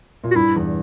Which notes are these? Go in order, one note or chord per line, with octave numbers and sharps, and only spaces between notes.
A#2
F#4
G2 E4
E2